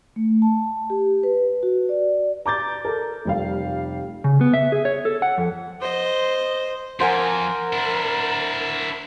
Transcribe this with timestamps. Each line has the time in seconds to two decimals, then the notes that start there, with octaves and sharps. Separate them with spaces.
0.16 A3
0.42 A5
0.90 G4
1.23 B4
1.63 F#4
1.89 D5
2.46 A#5 D6 G6 A6
2.85 A4 A#4
3.25 F1 G3 F5
4.24 C#3
4.41 B3
4.54 E5
4.72 G#4
4.85 C#5
5.05 A4
5.22 F#5
5.38 F2
5.81 C5 D#5
7.00 F2 A#4 C5 F#5 G#5
7.73 D4 E4